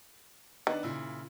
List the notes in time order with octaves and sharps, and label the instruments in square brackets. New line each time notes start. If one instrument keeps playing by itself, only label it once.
[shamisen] D#3 [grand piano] B3 D4
[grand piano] A#2 C#3 E4